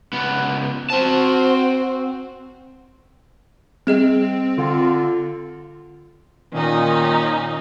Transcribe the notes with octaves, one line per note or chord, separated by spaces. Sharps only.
C#2 B3
C4 F#4 C5 A5
G3 C4 G#4 D#5
D3 F4
A#2 D#3 C#4 D#4